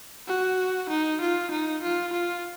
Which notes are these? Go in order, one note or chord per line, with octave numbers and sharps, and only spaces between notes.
F#4
D#4
F4
D#4
F4
F4